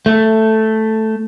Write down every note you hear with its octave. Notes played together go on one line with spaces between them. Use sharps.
A3